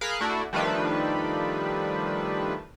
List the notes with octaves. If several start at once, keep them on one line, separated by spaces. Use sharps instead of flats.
G#4 A#4 F5 B5 F#6
A3 D4 E4 F#4
D#3 F3 G3 A3 D4 B4